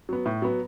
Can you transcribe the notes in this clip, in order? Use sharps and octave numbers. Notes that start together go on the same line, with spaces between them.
F#3 B3
A2
F#3 B3